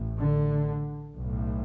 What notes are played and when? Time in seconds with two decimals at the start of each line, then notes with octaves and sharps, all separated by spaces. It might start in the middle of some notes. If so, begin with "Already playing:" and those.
Already playing: A1 A2
0.17 D3
1.16 B1 A2